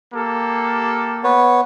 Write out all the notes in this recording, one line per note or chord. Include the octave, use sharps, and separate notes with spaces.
A#3 G4 A4
B3 B4 C#5